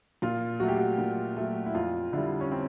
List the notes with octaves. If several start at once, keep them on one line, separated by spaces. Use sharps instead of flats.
A#2 F4
F#3 A3 F#4
G4
F#4
A#2
F#3 A3
E4
F2 F4
D3 G3 E4
C#4
C4